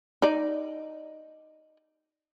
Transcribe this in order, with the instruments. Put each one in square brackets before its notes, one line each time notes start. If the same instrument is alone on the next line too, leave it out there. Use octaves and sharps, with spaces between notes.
[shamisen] D#4 D5